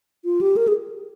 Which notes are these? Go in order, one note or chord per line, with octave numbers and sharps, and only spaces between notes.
F4
G4
A#4
G#4